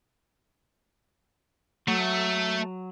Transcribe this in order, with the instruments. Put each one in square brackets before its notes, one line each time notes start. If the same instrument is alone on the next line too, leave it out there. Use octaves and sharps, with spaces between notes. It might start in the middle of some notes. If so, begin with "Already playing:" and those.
[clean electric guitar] F#3 [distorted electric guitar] A3